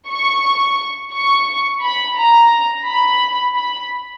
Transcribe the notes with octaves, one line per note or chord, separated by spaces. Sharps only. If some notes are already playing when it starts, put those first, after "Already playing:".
C#6
C#6
B5
A#5
B5
B5